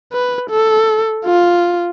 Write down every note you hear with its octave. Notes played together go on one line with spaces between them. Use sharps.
B4
A4
F4